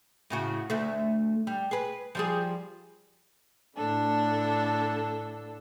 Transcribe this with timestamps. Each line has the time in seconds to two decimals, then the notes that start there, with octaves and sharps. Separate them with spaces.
0.30 A2 C#3 F#4
0.70 D2 A3
1.47 G3
1.71 G#4 B4
2.15 F3 G3 G#4
3.76 A2 D3 D4 A4